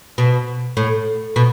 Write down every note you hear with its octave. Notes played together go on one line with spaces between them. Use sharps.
B2
A2
B2